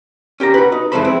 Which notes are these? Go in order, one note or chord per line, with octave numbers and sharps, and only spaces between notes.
C#4 G4 A#4 A#5
F#4 B4
D#4
F2 E3 G#3 A4 C5 B5
C4 E4